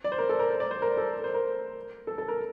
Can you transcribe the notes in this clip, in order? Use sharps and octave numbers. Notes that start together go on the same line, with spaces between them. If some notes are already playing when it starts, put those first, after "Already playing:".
D5
C5
A#4
A4
A#4
C5
D5
C5
A#4
A4
C5
A#4
A4
A4
A#4